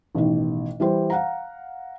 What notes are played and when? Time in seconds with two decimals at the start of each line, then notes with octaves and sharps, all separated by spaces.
0.15 A1 B2 D#3
0.80 E3 G3 C5
1.10 F5 F#5 A#5